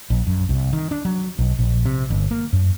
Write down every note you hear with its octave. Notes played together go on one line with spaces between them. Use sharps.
A#1
F#2
C2
D#3
D4
F#3
B1
A#1
C3
G1
A#3
F#2